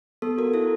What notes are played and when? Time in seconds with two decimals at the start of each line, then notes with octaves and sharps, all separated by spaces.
0.22 B3 A4
0.38 F#4 A#4
0.54 E4 A4